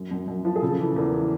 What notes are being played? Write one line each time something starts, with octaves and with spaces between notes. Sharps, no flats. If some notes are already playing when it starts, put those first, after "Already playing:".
Already playing: F#2
F#2
F#2
F3
G#4
C#3 A4
E3
E2 A#4
E3